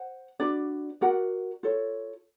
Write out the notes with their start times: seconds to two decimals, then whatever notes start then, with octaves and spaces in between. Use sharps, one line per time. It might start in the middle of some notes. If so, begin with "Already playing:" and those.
Already playing: C5 F#5
0.40 D4 F#4 B4 D5
1.01 F#4 A#4 D5 F#5
1.63 F4 A4 C#5